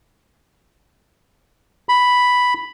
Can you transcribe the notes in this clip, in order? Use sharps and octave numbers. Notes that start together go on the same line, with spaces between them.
B5